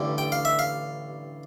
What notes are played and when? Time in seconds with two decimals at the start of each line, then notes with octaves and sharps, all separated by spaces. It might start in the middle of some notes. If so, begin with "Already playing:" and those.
Already playing: A1 G2 D3 G3
0.18 G5
0.32 F5
0.45 E5
0.59 F5